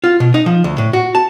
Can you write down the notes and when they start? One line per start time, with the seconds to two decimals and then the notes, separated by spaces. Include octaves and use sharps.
0.04 F4
0.20 B2
0.34 D#4
0.46 F3
0.64 D2
0.78 A2
0.93 F#4
1.15 A5